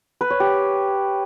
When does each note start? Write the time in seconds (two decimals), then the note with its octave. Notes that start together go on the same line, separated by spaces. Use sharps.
0.21 B4
0.30 C#5
0.40 G4